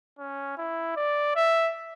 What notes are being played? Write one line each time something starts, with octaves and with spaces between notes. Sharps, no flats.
C#4
E4
D5
E5